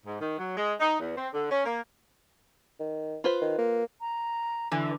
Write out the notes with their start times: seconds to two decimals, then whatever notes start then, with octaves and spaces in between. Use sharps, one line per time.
0.06 G#2
0.20 D#3
0.39 F#3
0.57 G#3
0.80 D#4
0.99 E2
1.17 C4
1.34 D3
1.51 C#4
1.65 A#3
2.80 D#3
3.24 F4 B4 C5
3.41 D#3
3.58 A#3
4.01 A#5
4.72 D3 E3